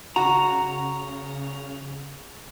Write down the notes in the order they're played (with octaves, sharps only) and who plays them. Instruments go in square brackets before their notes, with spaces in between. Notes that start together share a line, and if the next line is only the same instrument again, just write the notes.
[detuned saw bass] C#3 [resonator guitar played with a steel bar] F#4 [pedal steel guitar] A#5